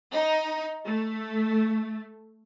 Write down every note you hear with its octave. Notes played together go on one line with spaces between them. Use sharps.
D#4
A3